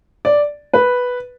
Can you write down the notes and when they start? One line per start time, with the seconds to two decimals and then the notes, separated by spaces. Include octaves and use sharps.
0.25 D5
0.74 B4